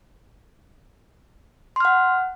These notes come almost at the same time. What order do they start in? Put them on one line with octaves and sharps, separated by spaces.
C6 F6 F#5